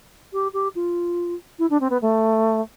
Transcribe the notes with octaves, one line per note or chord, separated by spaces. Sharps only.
G4
G4
F4
E4
D4
C4
B3
A3